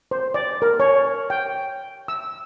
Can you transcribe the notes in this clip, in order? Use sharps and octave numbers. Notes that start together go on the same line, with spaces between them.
C5
D5
A#4
C#5
G5
E6